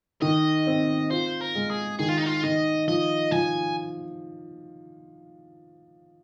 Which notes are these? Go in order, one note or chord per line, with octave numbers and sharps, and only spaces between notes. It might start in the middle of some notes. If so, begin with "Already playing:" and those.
D#3 D#5
C4
F4 C5
A#4
G#3
G#4
D#3 G#4
F4
D#4
F4
D#3 D#5
F3 D#5
F3 G#5